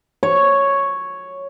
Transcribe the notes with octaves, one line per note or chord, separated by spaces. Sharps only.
C#5